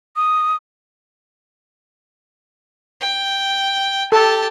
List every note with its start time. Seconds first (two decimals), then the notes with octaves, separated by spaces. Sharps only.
0.16 D#6
3.01 G5
4.12 G4 A4 A5